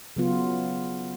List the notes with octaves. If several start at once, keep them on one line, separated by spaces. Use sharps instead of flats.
C#3 F#3 B3 F4